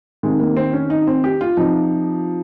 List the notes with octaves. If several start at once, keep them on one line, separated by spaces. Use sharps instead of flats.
C3 D#3 G#3
A#3
C4
C#4
D#4
C4
G4
F4
C3 F3 D#4